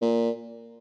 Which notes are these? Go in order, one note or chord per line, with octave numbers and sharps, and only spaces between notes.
A#2